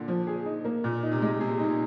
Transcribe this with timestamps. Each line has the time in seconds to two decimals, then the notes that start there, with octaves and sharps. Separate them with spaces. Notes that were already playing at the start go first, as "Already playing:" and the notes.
Already playing: A#2 D3
0.08 F3
0.27 G#4
0.46 D#4
0.65 A#3
0.84 A#2
1.03 D#4
1.12 C3
1.22 G#3
1.40 C3 G#4
1.48 A#2
1.59 A#2 D#4